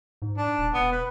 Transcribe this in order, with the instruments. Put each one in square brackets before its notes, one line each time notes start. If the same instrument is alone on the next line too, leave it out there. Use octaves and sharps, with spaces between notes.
[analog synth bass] G#2
[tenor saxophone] D4
[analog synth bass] D#1
[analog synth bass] E1 [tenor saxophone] B3
[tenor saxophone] B4